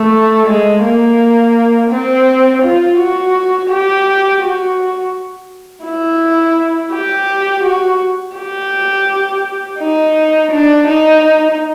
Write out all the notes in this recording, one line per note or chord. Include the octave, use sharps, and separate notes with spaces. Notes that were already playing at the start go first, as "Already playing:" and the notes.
Already playing: A3
G#3
A#3
C4
F4
F#4
G4
F#4
E4
G4
F#4
G4
D#4
D4
D#4